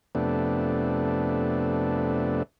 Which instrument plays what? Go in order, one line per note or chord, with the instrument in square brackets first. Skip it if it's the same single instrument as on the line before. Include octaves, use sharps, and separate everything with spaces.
[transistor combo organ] F2 C3 A3 B3 D4